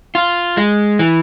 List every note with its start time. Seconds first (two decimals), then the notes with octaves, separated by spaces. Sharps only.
0.15 F4
0.57 G#3
0.99 E3